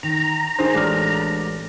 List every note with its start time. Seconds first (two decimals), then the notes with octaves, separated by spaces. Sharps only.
0.03 D#3 A#5
0.59 D#3 G#4 C5
0.74 A1 G#3 D4 F#4 F6